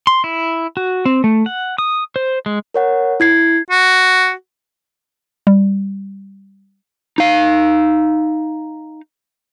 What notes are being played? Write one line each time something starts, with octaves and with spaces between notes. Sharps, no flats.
C6
E4
F#4
C4
A3
F#5
D#6
C5
G#3
A#4 C#5 F#5
E4 G#6 C7
F#4
G3
D#4 F5